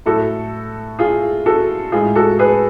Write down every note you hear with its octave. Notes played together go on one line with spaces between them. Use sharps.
A2 F#3 F#4 A4
F4 G#4
F#4 A4
A2 G#3 F4 G#4
F#4 A4
G#4 B4